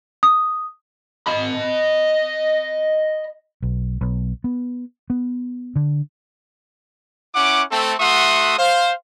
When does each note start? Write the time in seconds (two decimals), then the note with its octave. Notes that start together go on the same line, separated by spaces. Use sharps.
0.23 D#6
1.28 D#5 B5
3.62 B1
4.01 B1
4.44 B3
5.10 B3
5.76 D3
7.35 C#4 E4 F#5 D6
7.71 A3 C4 A4
8.00 A3 F#4 E5 F#5 C6 D#6
8.59 C5 F5